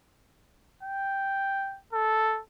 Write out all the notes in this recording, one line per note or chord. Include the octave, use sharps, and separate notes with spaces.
G5
A4